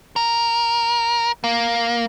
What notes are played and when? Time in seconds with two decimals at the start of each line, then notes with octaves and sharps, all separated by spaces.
0.16 A#4
1.44 A#3